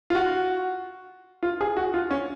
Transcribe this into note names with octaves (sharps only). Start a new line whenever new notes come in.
F4
F#4
F4
G#4
F#4
F4
C#4